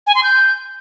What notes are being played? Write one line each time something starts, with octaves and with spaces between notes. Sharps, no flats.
G#5
C6
G6